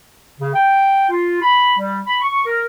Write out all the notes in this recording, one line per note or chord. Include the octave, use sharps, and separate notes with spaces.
C#3
G5
F4
B5
G3
B5
C#6
A#4